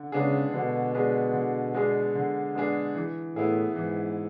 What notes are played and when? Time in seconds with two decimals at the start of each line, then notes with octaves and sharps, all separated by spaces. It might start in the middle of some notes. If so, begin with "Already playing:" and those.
Already playing: D3
0.12 C#3 G#3 B3 D4 G#4
0.53 B2 D3
0.94 G#3 B3 D4 G#4
1.33 D3
1.74 G#3 B3 D4 G#4
2.15 D3
2.55 G#3 B3 D4 G#4
2.95 E3
3.35 A2 B3 E4 G#4
3.76 G#2 E3